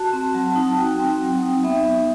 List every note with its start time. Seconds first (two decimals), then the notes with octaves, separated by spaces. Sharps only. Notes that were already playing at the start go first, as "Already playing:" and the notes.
Already playing: F#4 A5
0.13 C4
0.34 F#3 A5
0.56 D#4
0.67 A5
0.77 F#4 G5
1.00 C4
1.20 F#3 G5
1.43 D#4
1.63 B3 E5
1.85 D#4